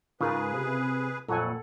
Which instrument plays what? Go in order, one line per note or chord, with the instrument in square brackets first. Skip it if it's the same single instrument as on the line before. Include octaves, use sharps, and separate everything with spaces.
[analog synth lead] G#2 [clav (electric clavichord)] C#3 [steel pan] F4 A#4 [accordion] G#4 B4
[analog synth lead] C3
[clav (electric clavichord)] F2 F#3 [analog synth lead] A#2 [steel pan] A4 F#5 G#5